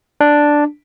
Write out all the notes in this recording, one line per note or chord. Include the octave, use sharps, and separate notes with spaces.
D4